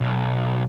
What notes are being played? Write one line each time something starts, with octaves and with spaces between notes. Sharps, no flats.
B1